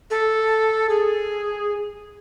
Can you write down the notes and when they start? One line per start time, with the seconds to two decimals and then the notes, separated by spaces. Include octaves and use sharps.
0.11 A4
0.89 G#4